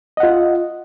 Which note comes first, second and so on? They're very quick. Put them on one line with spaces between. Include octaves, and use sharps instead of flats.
D#5 F#5 F4